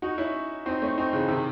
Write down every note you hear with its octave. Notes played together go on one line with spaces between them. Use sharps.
D#4 F#4
C#4 E4
C4 D#4
A3 C#4
C4 D#4
C#3 E3
C3 D#3